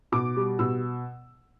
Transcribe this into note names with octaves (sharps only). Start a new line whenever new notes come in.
B2 D6
G3
B2 E6